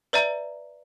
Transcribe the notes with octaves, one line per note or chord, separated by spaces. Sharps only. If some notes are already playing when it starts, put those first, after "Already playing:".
B4 D5 E5 A#5